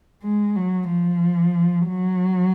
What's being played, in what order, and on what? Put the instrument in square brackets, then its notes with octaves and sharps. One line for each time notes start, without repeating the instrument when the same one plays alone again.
[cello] G#3
F#3
F3
F#3